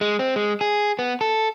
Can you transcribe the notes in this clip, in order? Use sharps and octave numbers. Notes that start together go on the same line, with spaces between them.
G#3
C4
G#3
G#4
B3
A4